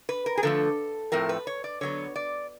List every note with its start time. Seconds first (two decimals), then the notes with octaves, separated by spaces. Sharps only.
0.09 B4
0.26 A#4
0.37 G#4
0.43 D3 F3 A3 A4
1.12 A2 F3 A3 C4 A#4
1.29 B4
1.47 C#5
1.64 D5
1.81 D3 F#3 B3 C#5
2.16 D5